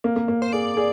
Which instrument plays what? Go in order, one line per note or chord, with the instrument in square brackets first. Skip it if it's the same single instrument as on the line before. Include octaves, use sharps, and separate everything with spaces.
[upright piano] A#3
A#3
A#3
[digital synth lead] C5
[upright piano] G#4 [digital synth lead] D5
[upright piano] G#4